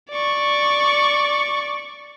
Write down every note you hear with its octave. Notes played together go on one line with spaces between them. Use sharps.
D5 C#6